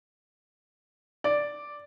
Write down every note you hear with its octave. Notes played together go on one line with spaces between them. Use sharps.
D5